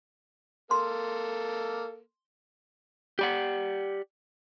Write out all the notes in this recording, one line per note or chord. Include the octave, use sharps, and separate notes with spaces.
A#3 A4 C6
G4 D5 F#5